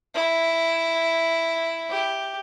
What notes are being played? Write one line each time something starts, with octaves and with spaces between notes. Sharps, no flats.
E4
G4